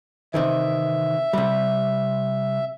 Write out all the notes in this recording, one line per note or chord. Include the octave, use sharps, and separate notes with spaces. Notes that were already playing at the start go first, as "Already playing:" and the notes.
C3 D#3 E3 E5
C3 G3